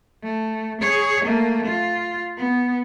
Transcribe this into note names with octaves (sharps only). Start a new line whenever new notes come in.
A3
G#4 C#5
A3 A#3
F4
B3